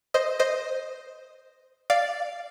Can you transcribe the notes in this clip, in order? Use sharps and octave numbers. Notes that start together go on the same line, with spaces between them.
C5 D#5
C5 D#5
D5 F5